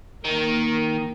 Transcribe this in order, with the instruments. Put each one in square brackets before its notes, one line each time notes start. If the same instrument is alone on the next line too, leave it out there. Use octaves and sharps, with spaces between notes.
[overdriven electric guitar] D#3 [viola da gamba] A#3 A#4